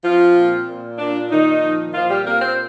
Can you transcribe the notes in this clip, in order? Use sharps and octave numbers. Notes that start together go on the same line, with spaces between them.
F3 C4 F4
A#2
A#2
A#2 D4
A#2 D#3 D#4
F3
A#2 F3 F4
G3 G4
A#3 C4 A#4
C4 C5